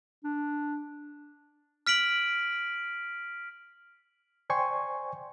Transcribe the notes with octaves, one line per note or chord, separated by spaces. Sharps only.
D4
F6 B6 D7 F#7
C5 D5 G5 G#5 C6 C#6